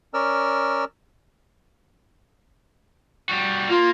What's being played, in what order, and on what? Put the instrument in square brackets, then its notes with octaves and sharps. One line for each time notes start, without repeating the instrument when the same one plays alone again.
[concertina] C#4 A#4 D5 E6 F6
[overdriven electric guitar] G3 F#4
[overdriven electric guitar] A#3 [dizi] F4